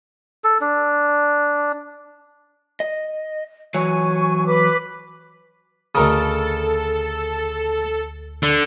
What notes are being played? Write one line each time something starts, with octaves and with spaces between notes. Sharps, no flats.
A4
D4
D#5
E3 F#3 C#5 G#5 C#6
B4 D6
D2 C#3 A4 A#4 D#5 D#6
D3